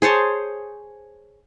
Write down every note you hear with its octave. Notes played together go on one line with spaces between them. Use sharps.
G#4 C5 C#5 A5